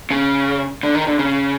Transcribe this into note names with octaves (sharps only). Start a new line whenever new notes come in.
C#3
D3
D#3
D3
C#3